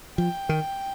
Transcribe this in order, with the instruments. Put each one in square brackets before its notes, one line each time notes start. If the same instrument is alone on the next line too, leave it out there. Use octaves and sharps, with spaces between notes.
[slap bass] F3 [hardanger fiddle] G5
[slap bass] D#3